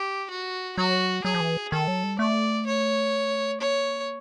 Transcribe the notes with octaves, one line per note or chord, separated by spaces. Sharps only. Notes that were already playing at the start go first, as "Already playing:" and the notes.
Already playing: G4
F#4
F#3 F#4
F#3 G#4
F3
E3
D#3 A4
F#3
G3
A3 D5
C#5
A#3 C#5